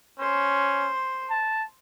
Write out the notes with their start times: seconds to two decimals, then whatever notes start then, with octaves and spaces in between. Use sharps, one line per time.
0.19 C#4 C5
1.30 A5